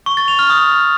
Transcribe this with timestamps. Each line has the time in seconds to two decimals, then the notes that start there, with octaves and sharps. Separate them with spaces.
0.06 C#6
0.17 A6
0.28 F7
0.39 F6
0.50 D#6